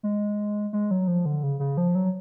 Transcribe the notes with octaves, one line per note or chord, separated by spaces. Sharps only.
G#3
G#3
F#3
F3
D3
C#3
C#3
F3
F#3